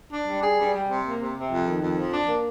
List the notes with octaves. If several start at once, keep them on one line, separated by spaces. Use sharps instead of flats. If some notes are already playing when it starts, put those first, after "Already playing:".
D4
G3
G#4
G3
G3
C3
A#3
C3
C3
F2
D#3
F2
F3
D4
A#3